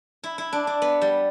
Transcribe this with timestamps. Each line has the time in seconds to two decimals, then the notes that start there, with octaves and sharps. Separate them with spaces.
0.23 E4
0.38 E4
0.53 D4
0.67 D4
0.82 B3
1.01 G3